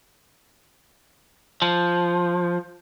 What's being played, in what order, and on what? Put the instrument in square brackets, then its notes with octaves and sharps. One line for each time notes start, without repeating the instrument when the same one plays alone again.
[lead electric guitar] F3